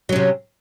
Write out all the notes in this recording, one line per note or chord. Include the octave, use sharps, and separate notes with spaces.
C3 F#3 C#4